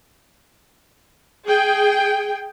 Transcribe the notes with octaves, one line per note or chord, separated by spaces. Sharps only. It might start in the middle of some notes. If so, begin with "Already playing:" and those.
G#4 G5